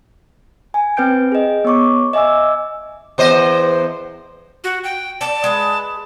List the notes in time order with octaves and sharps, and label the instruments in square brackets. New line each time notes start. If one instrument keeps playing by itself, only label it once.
[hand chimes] G#5
C4 B4 G5 G6 D7
G#4 D#5
B3 C#5 C#6 D6
D#5 E5 G#5 D6 E6
[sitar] E2 C5 D#5
[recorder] F#4
G5
[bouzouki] D5 [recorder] A5
[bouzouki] G#3 B4